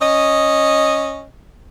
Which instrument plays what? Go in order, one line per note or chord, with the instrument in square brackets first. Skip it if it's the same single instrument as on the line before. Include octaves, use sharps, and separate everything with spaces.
[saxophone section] C#4 D#5